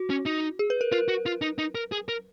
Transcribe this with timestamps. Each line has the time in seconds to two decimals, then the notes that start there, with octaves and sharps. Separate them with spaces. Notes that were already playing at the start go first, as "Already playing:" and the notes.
Already playing: F#4
0.10 C#4
0.26 D#4
0.59 G#4
0.70 B4
0.81 A#4
0.92 F4 A#4
1.08 F#4
1.26 F4
1.41 D#4
1.58 D#4
1.75 A#4
1.92 G#4
2.09 A#4